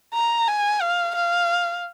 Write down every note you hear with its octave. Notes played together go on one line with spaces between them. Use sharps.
A#5
G#5
F5
F5